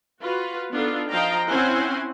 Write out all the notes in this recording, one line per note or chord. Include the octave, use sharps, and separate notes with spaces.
F4 F#4 B4
B3 D4 D#4 F4 A4
F3 C5 D#5 F5 G5 A#5
C4 C#4 E4 C5 F#5 G#5